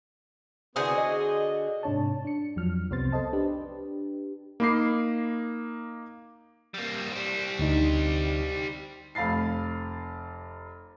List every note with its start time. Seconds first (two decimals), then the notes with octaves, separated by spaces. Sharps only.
0.76 D3 E3 B3 F#4 G#4 C5
0.97 D#5
1.83 G#2 C3 D4 C#5 A5
2.25 D4 C#7
2.56 F2 F3 F#3 F6
2.90 C2 C3 B3 C5 C6 A6
3.12 A4 C5 D#5 A5
3.33 D4 G4 B4
4.60 A#3 D#4 B5 D6 C7
6.74 G3 A#3
7.12 G3 C4
7.59 D2 D3 D#4
9.15 F1 F5 B5 A6 C7